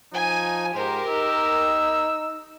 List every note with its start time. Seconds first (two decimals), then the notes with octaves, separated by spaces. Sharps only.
0.13 F3 D#4 G#5
0.75 G#2 G4 A#4 C5
1.09 D#4 E6